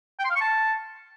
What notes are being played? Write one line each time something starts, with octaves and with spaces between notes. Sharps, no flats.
G5
C6
F5
C#6
A5